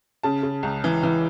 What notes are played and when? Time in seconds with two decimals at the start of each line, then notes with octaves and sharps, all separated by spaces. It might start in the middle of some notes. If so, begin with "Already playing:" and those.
0.23 C#3 A5
0.43 C#3
0.63 C#2
0.84 E3
1.03 E3